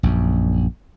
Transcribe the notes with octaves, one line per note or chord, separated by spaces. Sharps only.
A#1 F#2